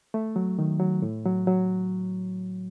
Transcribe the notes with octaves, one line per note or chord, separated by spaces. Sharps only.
A3
F#3
D#3
F#3
A2
F#3
F#3